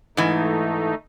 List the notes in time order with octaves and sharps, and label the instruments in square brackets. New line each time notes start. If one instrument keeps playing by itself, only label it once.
[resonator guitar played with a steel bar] G#2 E3 [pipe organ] A3 D#4